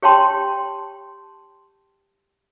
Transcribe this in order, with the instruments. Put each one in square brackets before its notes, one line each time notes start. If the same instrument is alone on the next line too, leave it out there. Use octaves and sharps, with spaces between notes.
[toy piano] G4 C#5 G5 A5 C6